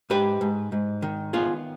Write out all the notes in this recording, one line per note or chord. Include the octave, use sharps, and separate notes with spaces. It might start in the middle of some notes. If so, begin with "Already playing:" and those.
G#2 G4 B4
G#2
G#2
D#3
B3 F4 G#4